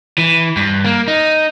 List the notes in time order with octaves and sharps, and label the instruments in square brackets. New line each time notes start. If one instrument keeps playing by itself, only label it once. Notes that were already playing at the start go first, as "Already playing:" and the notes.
[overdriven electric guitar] E3
G2
A#3
D#4